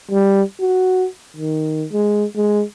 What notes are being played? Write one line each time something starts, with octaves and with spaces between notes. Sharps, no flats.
G3
F#4
D#3
G#3
G#3